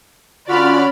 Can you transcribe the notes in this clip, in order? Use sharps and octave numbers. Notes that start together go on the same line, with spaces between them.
D3 C#4 F4 F#4 D5 B5 F6